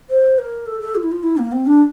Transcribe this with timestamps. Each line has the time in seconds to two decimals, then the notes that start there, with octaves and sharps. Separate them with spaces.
0.10 C5
0.39 A#4
0.66 A4
0.81 A4
0.95 F4
1.03 E4
1.12 F4
1.23 E4
1.38 A#3
1.52 C4
1.66 D4